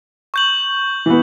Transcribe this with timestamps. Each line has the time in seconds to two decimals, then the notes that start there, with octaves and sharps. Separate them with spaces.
0.34 C#6 G6 F#7
1.06 E3 B3